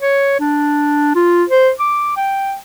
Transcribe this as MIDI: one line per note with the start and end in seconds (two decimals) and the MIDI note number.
0.02 0.38 73
0.40 1.12 62
1.15 1.44 65
1.50 1.71 72
1.80 2.15 86
2.17 2.56 79